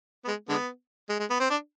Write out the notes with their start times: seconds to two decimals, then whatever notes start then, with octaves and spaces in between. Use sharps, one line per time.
0.25 B3
0.28 G#3
0.49 D3 G#3 B3
1.09 G#3
1.20 G#3
1.30 B3
1.40 C4
1.50 D4